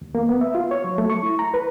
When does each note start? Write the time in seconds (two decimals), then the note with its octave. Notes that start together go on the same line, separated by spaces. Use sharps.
0.01 D#2
0.15 A#3
0.29 B3
0.41 E5
0.55 F4
0.71 C#5
0.84 F#3
0.98 A3
1.10 C#6
1.23 E4
1.39 A#5
1.54 B4